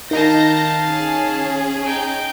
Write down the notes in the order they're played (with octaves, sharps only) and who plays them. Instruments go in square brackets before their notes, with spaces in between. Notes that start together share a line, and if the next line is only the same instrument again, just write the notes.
[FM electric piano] D#3 D#4 [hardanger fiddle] F5 A5 [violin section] G6 A#6
[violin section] C#4 G#4
[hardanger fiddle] D#4 G5